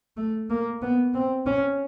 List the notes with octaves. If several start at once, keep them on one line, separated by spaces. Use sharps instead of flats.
A3
A#3
B3
C4
C#4